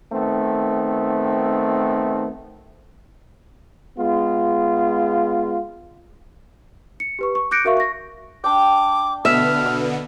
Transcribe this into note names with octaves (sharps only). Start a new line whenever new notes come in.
D#3 A3 B3 C4
G#3 B3 F4
C#7
G4 B4 C#6
C#6
D6 F#6 G6 A#6 C#7 D7
F#4 A#4 E5 F5 C#6
C#6 A#6
D4 G5 D6
B2 D3 B3 E5 F6
E6